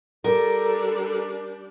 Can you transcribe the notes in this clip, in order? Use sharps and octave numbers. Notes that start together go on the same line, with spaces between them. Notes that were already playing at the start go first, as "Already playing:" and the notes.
G3 D4 A4 A#4